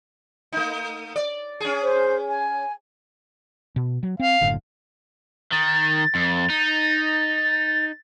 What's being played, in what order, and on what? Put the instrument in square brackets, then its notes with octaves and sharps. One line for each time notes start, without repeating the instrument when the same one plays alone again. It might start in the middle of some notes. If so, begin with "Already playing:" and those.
[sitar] A3 D#4
D5
C#4 G#4
[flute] C5
G#5
[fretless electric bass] B2
F#3
[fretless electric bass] C4 [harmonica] F5
[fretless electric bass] F#1 A2 D3
[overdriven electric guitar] D#3 [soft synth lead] A6
[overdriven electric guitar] F2
D#4